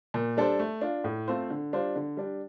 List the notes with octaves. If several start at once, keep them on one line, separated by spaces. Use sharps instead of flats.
A#2
G3 D4 A4 C5
A3
D4 F4
A2
A3 C4 F4 C5
D3
G3 D4 F4 C5
D3
G3 D4